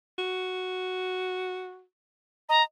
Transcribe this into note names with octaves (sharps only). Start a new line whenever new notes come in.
F#4
D#5 A#5